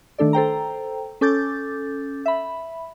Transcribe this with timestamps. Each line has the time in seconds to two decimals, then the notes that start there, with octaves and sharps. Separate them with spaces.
0.18 D#3 A3 D4 A4 D5
0.33 A4 C5 G5 A#5
1.21 C#4 A4 D6 G6 A6
2.26 E5 B5